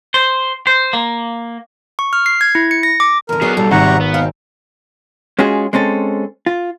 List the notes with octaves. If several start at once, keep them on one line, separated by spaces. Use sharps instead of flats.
C5
C5
A#3
C#6
F6
C7
G#6
E4
C#7
A#6
D6
E2 D3 A#4
F#3 B3 D4 F#4 G#4 C7
B1 A#2 G3 A4
G#1 C3 F#5 A#5 C#6
B3
B2 C4 D#4 F5
G#3 C#4 F4 F#4 G#4
G#3 C4 C#4 A4
F4